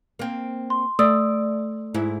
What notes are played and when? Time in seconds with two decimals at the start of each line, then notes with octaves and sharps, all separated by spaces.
0.19 A#3 C4
0.70 C6
0.99 A3 D5 D#6 E6
1.94 G#2 E4